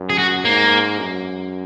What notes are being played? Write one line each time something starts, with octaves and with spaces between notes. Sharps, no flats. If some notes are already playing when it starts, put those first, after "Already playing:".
Already playing: F#2
G#4
F#4
G#2 A#3
F#2